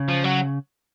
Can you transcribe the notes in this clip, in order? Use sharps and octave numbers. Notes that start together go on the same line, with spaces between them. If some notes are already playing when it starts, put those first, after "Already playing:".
Already playing: C#3
F3
F#3